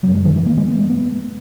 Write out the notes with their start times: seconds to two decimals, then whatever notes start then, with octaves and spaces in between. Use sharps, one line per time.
0.03 C#3 F#3
0.07 F#2
0.14 G#3
0.25 D#3
0.36 E3
0.46 A#3
0.57 G#3
0.68 B3
0.79 G#3
0.90 B3